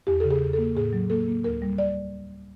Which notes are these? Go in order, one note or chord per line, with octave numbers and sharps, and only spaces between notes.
E2 G4
C#3 A4
G#4
E2
A4
A#3
A2 G#4
F#3
A#3 A4
A#3
D2 A#4
G3
D5